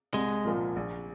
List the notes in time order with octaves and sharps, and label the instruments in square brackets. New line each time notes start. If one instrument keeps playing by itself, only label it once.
[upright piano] C2 [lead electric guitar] G#3
[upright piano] A#2 F3 A#3 F4
A#1